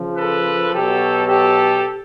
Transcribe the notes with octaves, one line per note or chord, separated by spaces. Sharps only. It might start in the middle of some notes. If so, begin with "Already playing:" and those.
Already playing: C#3 F3
A4 B4
B2 F#3 G4 A4
G4 A4